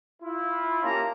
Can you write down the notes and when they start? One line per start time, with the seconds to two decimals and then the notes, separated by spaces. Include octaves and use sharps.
0.22 E4 F4
0.83 A#3 C#4 G4 A5 A#5